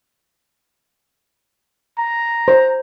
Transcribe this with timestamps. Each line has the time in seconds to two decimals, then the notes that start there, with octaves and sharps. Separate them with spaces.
1.98 A#5
2.48 C5